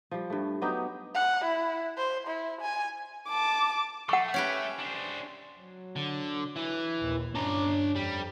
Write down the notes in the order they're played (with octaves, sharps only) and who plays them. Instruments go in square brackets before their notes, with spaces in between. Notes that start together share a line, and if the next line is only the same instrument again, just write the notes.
[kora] F3 G3
G2 A3
F#3 B3 D#4 G4
[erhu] F#5
E4
C5
E4
G#5
[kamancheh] A5 D6
[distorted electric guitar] A3 [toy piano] F#5 C#6
[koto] C#4 G4 B4
[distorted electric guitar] D4 C5
[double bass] F#3
[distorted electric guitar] D3
E3
[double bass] A#1 D#2
[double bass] G1 C#4 [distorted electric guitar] D4 A#5
[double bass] F2 [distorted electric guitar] G3